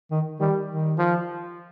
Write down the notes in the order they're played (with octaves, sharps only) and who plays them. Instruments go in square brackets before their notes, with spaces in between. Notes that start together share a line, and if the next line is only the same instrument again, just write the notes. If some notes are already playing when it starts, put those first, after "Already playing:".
[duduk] D#3
[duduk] D#3 [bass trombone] G3
[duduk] D#3
[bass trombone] F3